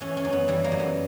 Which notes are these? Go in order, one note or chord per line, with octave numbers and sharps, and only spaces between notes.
E3 C#4
C#4
F#2
B3
E3 G3
A#3
F#2
B3